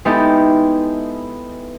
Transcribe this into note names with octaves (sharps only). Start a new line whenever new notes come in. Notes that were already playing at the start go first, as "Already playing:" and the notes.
G#3 B3 D#4 E4 G4 A4